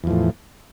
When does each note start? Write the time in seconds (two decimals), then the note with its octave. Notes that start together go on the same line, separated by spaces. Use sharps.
0.04 E2
0.07 F3
0.11 A2